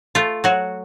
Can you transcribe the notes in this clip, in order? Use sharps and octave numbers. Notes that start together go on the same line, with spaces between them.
A3 F4
F#3 F#4